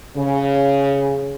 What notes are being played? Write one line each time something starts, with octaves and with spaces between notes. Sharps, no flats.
C#3